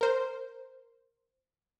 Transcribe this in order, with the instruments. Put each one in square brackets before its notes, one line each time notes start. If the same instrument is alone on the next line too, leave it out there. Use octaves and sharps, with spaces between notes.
[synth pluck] A#4 C5